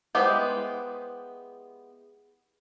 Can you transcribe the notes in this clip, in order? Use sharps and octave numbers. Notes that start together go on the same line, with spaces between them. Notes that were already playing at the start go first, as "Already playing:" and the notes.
G#3 B3 E4 G4 C5